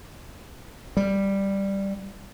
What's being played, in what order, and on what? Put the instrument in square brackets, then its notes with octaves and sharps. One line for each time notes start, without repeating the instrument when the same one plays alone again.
[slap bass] G3